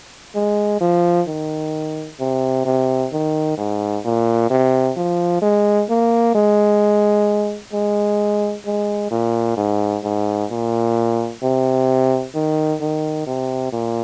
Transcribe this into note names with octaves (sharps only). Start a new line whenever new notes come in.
G#3
F3
D#3
C3
C3
D#3
G#2
A#2
C3
F3
G#3
A#3
G#3
G#3
G#3
A#2
G#2
G#2
A#2
C3
D#3
D#3
C3
A#2